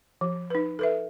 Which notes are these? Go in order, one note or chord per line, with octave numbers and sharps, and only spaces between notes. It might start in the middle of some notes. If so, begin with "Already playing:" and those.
F3
D#4 B4
A4 B4 E5